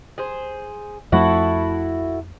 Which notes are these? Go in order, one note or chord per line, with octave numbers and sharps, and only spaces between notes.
G#4 C5
F2 F3 A3 E4 F#4 A4